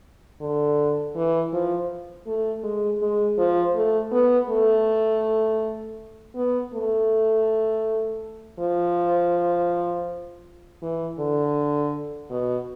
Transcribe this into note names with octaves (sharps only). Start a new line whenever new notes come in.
D3
E3
F3
A3
G#3
G#3
F3
A3
B3
A3
B3
A3
F3
E3
D3
B2